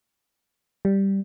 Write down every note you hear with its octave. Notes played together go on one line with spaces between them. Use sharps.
G3